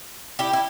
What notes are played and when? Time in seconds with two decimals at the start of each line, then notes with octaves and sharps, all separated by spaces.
0.39 E4 G4
0.53 E4